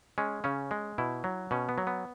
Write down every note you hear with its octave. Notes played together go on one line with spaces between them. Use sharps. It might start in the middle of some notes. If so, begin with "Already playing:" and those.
G#3 C#4
C#3 C#4
G#3
B2 E4
F#3
B2 C#4
B3
F#3
B3